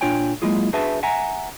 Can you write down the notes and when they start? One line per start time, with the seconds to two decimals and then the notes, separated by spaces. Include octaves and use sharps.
0.01 A#2 D4 F4 C#5 G5 G#5
0.42 F#3 G#3 A#3 E4 F4 G#4
0.73 D4 F#4 G#4 B4 E5 A5
1.03 E5 F#5 G#5 A#5